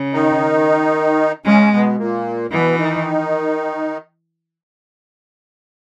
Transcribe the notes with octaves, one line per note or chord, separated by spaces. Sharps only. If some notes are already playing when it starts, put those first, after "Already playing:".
Already playing: C#3
D#3 D#4
C#3 G#3 C#4
B2 B3
A#2 A#3
B2 E3 B3
D#3 D#4